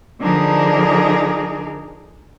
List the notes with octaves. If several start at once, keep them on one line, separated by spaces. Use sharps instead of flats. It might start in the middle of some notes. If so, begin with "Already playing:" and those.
D3 F3 D4 D#4 G#4 A#4